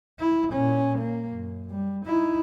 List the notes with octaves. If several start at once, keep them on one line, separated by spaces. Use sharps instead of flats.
E4
A#2 C#4
A#3
F#2
G3
D#4 E4